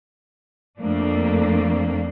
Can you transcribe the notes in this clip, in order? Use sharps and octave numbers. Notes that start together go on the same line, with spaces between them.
F2 A3 A#3 C4 D4